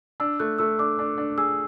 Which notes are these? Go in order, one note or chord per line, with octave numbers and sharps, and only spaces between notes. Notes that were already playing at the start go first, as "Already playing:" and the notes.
D4 E6
A3 F#6
A3 E6
D4 D6
D4
D4
G#4 E6